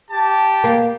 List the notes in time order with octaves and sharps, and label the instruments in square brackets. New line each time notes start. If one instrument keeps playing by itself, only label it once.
[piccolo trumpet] G4 [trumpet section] A5
[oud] A#3